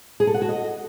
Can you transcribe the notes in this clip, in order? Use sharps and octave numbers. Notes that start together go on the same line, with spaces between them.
G#4
A4
F#5
F#4
D#5